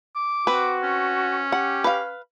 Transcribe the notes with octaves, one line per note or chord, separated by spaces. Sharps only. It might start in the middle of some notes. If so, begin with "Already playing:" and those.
D6
C4 F#4 B4
C#4
G4 F#5
B4 F5